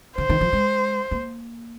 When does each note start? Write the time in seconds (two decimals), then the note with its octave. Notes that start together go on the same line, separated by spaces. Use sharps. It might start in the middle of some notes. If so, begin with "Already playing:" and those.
0.17 D3 C5
0.29 D#3
0.41 F3
0.53 G#3
1.11 A#3